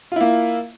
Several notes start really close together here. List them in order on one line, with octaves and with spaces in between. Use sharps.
F4 E4 A#3